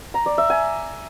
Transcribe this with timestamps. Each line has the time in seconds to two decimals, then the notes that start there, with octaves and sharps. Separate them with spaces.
0.14 A#5
0.26 D5
0.38 E5
0.50 G#5